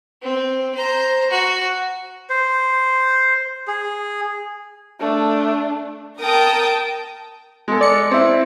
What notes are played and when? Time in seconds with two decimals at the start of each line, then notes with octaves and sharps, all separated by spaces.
0.22 C4
0.75 C5 A#5
1.31 F#4
2.30 C5
3.68 G#4
5.00 A3 D4
6.20 A#4 G5 A5 D#6
7.68 G#3 A4
7.81 D5 C#7
8.11 C4 E4